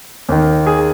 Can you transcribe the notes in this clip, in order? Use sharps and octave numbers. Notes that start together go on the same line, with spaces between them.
D#2 D#3
G#4